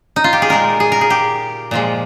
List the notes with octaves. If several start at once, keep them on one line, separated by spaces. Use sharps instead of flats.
D#4
F4
G4
G#4
A#2 G#3 A#4
G#4
A#4
G#4
G4
A#2 F3 G#3